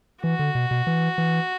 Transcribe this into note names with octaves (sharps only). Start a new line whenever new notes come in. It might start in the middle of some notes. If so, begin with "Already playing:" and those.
E3 F#4
D3
B2
B2
E3
E3